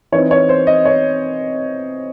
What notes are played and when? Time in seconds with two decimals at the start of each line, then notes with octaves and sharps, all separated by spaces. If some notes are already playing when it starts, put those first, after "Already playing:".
0.12 E3 C4 D#4 C#5
0.31 C#5
0.49 C5
0.67 D#5
0.85 C#5